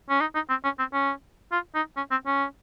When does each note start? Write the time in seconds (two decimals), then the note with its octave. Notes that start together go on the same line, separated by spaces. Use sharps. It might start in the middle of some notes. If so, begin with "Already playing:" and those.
0.10 C#4
0.21 D#4
0.35 D#4
0.49 C4
0.64 C#4
0.79 C4
0.93 C#4
1.52 F4
1.75 D#4
1.97 C#4
2.11 C4
2.26 C#4